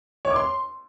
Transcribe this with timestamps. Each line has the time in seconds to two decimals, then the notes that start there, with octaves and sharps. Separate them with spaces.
0.25 C#5
0.30 D6
0.36 C6